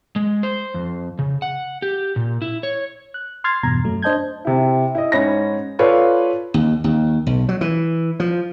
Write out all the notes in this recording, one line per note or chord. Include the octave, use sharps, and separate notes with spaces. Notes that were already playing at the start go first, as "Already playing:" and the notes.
G#3
C5
F2
C#3
F#5
G4
A#2
E4
C#5
F#6
C6 F6 G#6 A6 C7
E2 G2 B2 A#5 G#6
F#2 F#3 A3
D4 C5 D#5 A5 G6 G#6
C3 E4
E4 D#5
G#2 C#4 C#5 B5 A#6
F4 A4 B4 C#5 D5 F5
D#2
D#2
B1
F#3
E3
F3